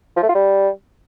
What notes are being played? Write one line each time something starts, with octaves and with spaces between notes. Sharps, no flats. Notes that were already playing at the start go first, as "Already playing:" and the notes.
F3
A3
F4
G3